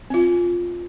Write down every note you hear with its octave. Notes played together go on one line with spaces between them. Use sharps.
C4 F4